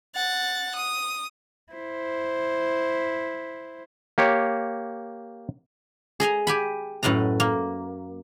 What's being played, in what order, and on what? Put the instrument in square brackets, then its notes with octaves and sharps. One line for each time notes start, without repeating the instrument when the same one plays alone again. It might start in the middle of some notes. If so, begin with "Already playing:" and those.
[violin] F#5 A6
D#6
[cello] E4 C5
[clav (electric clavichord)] A#3 G4 C#5
[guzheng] G#4 D#5 G#5 A#5
G4 G#5 B5
F#2 A2 B4 D#5 A#5
A#3